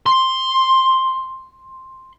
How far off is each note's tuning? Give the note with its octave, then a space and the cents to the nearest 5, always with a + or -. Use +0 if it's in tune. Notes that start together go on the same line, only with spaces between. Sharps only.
C6 +5